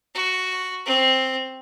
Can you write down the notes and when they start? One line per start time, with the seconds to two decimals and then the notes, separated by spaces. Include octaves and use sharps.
0.15 F#4
0.86 C4